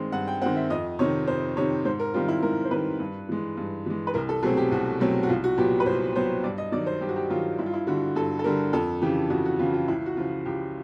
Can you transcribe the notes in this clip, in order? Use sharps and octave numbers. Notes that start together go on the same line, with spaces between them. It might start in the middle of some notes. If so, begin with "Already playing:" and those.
Already playing: G2 D#3 G#3 C4
G2 F#5
G5
D#3 G#3 C4 F#5
E5
F2 D#5
C3 D#3 C#5
F2 C5
C3 D#3 C#5
G#2 C5
A#4
D#3 G3 C4 F4
E4
G#2 A#4
C5
D#3 G3 C4 B4
G2
E3 G#3
G2
E3 G#3
B4
C2 A#4
A4
B2 F#3 A3 C4 G#4
G4
C2 F#4
B2 F#3 A3 C4
F#4
C2 F4
F#4
A#2 F#3 B3 G4
B4
C2 C5
A#2 F#3 B3 C5
G2 D5
D#5
D#3 F#3 D5
C5
G2 G4
F#4
G4
D#3 F#3 F4
G2 E4
F4
E4
D3 G3 F#4
G2 A4
A4
D3 G3 A#4
F2 A4
C#3 E3 G4
F2 F#4
F#4
C#3 E3 F4
F4
C#2 E4
F#4
C#3 F3 F4
C#2 G4